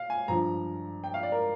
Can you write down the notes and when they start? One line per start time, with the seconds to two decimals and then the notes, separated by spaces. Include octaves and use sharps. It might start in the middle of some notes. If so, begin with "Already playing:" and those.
Already playing: F5
0.10 G#5
0.28 G2 F3 A#5
1.04 G5
1.14 F5
1.23 D5
1.32 A#4